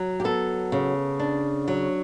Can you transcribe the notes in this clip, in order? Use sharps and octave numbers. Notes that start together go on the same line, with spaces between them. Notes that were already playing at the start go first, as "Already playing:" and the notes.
Already playing: F#3
G4
B3 A4
C#3
D4
F#3